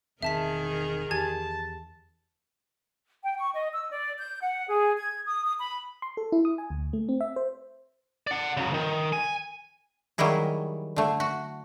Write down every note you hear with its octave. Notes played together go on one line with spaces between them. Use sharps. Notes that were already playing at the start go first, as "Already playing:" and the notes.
E1 D#3 C4 G#4 A#4 E5 A5 B6
E2 G4 G#5 A5 G#6
G5
C#6
D#5
E6
D5
G6
F#5
G#4
G#6
D#6
D#6
B5
C6
A4
E4
D#6
G#5
D2
A3
C4
E5
C5
D5 F#5
C#3 F#3
D#3
G#5
D#3 F#3 G3 E4 G#4
D3 A3
F#4